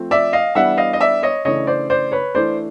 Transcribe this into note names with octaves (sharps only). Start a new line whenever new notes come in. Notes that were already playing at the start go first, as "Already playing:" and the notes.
Already playing: F3 A3 C4
D5 E5
D#5 F5
E3 G3 B3 D4 E5 F#5
D#5 F5
D#5
D5 E5
C#5 D#5
C#3 E3 A3 D4 C#5 D#5
C5 D5
C5 D5
B4 C#5
E3 A3 D4 C5 D5